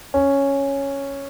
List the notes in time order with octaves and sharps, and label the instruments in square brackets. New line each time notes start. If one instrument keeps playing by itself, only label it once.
[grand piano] C#4